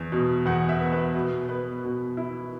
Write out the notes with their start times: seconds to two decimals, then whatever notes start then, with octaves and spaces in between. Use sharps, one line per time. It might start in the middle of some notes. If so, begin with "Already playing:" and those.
Already playing: E2
0.12 B2
0.46 E2 F#5
0.69 E5
0.80 B3
0.92 B4
1.15 B2
1.49 B3 B4
1.84 B2
2.17 E4